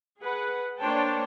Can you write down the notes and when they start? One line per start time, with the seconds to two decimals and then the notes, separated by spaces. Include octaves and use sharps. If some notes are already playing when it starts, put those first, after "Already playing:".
0.20 G#4 B4 F#5
0.81 A#3 D4 C5 C#5 G5 A5